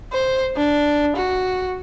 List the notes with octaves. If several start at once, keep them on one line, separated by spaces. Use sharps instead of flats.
C5
D4
F#4